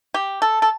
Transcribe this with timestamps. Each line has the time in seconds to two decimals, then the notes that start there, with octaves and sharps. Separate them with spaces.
0.14 G4
0.42 A4
0.62 A4